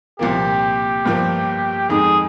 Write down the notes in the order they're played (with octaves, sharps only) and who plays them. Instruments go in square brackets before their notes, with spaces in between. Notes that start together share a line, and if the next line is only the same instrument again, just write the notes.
[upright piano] C2 A#2 F3 A#3 [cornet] G4
[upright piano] G1 G2 F3 A#3
[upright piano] F2 D#3 G#3 D#4 [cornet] G#4